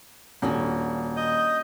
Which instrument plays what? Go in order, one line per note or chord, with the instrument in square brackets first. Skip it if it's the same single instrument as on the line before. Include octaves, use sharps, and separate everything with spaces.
[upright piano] D#1 [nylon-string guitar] C#4 D4 F#4
[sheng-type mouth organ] D#5 D#6 G6